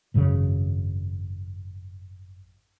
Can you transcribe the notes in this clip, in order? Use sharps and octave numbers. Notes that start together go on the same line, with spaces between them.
G#1 F#2 A2 C#3